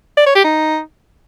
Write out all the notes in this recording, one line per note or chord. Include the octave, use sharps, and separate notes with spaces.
D5
C#5
G4
D#4